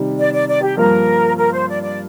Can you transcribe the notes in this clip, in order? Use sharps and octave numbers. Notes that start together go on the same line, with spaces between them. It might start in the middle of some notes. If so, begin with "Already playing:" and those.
Already playing: C3 D#3 G3
D5
D5
D5
G4
G2 F3 A#3 F4 A#4
A#4
C5
D5
D5